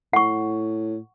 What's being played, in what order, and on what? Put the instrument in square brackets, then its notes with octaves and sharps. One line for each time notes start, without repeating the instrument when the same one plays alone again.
[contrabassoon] A2 [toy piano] F#5 C#6